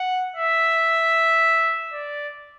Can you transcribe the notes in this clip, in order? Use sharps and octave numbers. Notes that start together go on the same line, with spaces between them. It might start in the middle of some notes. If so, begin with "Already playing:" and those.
Already playing: F#5
E5
D5